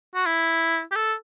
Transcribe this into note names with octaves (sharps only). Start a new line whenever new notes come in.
F#4
E4
G4
A4